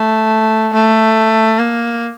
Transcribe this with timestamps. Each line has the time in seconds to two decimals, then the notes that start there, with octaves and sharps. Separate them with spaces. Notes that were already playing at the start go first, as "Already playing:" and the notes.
Already playing: A3
0.73 A3
1.58 A#3